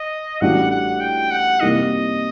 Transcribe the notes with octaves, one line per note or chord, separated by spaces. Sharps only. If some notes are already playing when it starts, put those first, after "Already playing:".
Already playing: D#5
A1 A2 G3 D4 F#4 F#5
F#5
G5
F#5
C3 G3 A#3 D#4 D#5